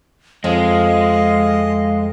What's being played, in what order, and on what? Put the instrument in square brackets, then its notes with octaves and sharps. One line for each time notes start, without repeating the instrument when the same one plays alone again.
[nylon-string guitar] F2 [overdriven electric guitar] G#3 [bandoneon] D#5 [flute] F5